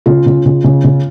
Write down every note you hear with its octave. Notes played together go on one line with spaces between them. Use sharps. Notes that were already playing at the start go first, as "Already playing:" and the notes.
C#3 F4
C#3
C#3
C#3
C#3